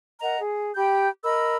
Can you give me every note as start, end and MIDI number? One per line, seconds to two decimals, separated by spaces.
0.21 0.38 70
0.21 0.38 75
0.21 0.38 78
0.21 0.38 82
0.40 0.74 68
0.76 1.08 67
0.76 1.08 79
0.76 1.08 83
0.76 1.08 91
1.23 1.57 70
1.23 1.57 75
1.23 1.57 83
1.23 1.57 88